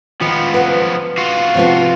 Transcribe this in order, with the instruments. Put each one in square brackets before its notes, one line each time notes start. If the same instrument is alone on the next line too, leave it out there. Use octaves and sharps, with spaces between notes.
[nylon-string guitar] D#3 [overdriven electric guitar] F3 B3
[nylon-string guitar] B4 F#5
[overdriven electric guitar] F4 F#4
[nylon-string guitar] C3 F3 B3